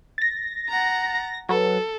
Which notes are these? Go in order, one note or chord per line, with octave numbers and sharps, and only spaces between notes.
A6 A#6
F#5 A#5
F#3 A4 B4